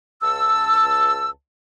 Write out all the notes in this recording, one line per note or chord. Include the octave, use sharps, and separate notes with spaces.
C#2 A5 E6